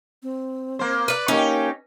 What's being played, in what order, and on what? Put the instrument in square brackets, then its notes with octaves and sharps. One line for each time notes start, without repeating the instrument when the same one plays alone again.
[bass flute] C4
[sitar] A#3 C5
[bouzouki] B4 D5
[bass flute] A#3 [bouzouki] C#4 [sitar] D#4 G4